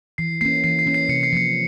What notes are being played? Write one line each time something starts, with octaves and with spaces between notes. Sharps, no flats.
E3 C7
A#3 C#4 C7
E3 C7
C7
A#3 C#4
C7
C3 C#7
C7
F3 A#3 C#7